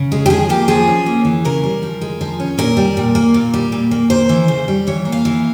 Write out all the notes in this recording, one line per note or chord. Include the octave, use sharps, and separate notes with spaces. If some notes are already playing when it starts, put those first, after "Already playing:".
Already playing: C#3
G#3
G4
F3 G#4
A#3 G4
F3 G#4
C#4
A#3
E3
C#3 A#4
G3
F3
G#3
F3
C#4
A#2 A#4
G3
A#2
A#3
A#2
G3
A#2
A#3
A#3 C5
E3
C#3
G3
E3 C#5
A#3
F5
E3